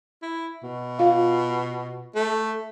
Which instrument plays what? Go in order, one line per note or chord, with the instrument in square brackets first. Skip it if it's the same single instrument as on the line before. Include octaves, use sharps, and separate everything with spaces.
[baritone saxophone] E4
B2
[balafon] F4 F5
[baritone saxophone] A3